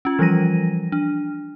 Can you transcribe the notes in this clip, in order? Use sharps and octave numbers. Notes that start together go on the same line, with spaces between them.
C#4 F4
E3 F3 G3 A#6 D#7
D4